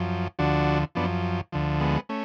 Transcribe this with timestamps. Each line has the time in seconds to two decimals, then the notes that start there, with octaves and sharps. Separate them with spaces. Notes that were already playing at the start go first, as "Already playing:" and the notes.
Already playing: F#2 F3
0.39 D2 D3 F3 D4 F#4
0.95 F#2 F3 B3 D4
1.52 D2 D3 F3
1.80 G#3 B3
2.09 A3 C#4